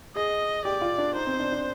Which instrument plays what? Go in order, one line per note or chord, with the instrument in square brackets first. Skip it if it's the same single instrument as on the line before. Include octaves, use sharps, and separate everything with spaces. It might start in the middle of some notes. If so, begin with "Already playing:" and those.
[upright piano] G#4 [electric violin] D#5
[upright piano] G4 [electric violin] D5
[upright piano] F4
D4
[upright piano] D#4 [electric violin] C5
[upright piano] C4
D4
D4